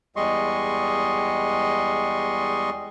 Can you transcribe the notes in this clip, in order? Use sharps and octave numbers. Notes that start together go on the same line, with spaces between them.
E2 G3 G#3 D#5 C6 C#6